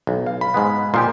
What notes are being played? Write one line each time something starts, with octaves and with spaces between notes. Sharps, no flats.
B1
F5
B5
G#2 G#3 B3
A#2 F3 A#3 G4 G#5 C6